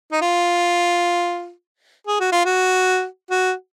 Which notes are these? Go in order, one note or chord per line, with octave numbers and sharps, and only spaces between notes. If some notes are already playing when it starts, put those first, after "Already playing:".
D#4
F4
G#4
F#4
F4
F#4
F#4